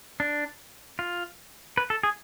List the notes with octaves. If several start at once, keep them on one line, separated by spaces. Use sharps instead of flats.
D4
F4
B4
A4
G#4